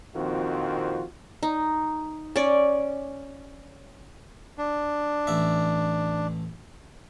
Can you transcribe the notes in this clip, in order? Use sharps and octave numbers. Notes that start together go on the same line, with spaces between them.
A#1 F2 D#3 C4 F4 F#4
D#4
C#4 D5
D4
A1 E5